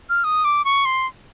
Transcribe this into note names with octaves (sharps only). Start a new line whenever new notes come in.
F6
D#6
D6
C#6
C6